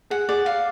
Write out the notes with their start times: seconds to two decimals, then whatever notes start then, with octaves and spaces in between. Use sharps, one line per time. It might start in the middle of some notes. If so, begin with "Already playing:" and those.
0.10 G#4 F#5
0.29 G#4 D5
0.46 F5